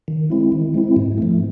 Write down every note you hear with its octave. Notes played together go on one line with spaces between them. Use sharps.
D#3
G#3 C4 E4
D#3
G#3 C4 E4
G#2
F3 A3